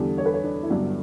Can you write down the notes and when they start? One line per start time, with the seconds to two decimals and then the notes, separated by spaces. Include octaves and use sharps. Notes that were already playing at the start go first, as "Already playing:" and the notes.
Already playing: E2 D3 G3 G4
0.18 C#5
0.26 B4
0.34 C#5
0.44 D4
0.63 E4
0.70 G1 G2 D3 F#3 D4